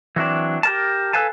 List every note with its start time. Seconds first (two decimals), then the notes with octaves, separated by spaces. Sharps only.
0.16 E3 F#3 C4 D4
0.63 G4 A#4 A5
1.13 A4 B4 F5 G#5 A5